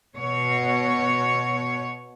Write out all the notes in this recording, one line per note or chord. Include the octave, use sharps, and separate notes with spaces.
B2 C#5